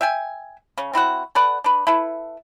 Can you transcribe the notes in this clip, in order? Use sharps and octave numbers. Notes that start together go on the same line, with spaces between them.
E5 G5 G#5
C#3 C#4
C4 E4 F#4 F#5
A4 B4 D5 F#5
D4 B4
E4 A4 B4